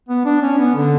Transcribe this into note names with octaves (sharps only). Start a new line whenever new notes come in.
B3
D4
C#4
B3
D3